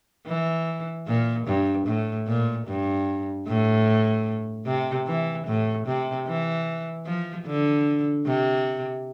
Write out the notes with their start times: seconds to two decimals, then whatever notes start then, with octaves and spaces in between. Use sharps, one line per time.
0.27 E3
1.08 A#2
1.47 G2
1.87 A2
2.27 A#2
2.67 G2
3.47 A2
4.66 C3
5.07 E3
5.47 A2
5.87 C3
6.27 E3
7.06 F3
7.46 D3
8.26 C3